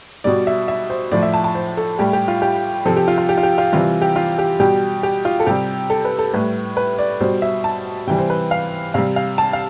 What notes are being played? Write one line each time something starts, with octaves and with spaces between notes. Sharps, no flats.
B2 G3 D5
E5
E5
C5
A2 F3 D5
E5
A5
A5
C5
A4
A2 G3 G4
G4
F4
G4
C3 F3 A4
G4
F4
F4
G4
F4
G4
F4
C3 E3 G3 F4
G4
F4
G4
B2 G3 G4
G4
F4
A4
C3 G3 G4
A4
B4
A4
A2 G3 B4
B4
D5
B2 G3 C5
E5
A5
C3 E3 G3 G5
C5
B4
F5
C3 G3 F5
F5
A5
F5